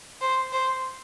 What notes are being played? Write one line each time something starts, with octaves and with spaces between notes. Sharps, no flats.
C5
C5